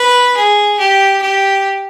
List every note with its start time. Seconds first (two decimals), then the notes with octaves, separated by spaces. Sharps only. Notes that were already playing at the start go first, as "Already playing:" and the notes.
Already playing: B4
0.36 G#4
0.79 G4
1.22 G4